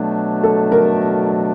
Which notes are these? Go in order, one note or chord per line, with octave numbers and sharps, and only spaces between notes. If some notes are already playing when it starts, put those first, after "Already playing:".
Already playing: B2 F#3 A3 D4
A4
A#4